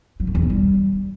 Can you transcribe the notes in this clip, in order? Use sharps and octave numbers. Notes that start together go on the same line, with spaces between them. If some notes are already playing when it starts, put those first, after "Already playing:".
F#3
D3
E2
D#3
G3